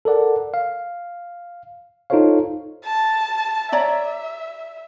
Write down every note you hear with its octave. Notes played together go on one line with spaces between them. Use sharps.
A4 A#4 D5 F#5
F5
D#4 F4 A4 C5 C#5 F5
A5
C#5 D5 E5 A#5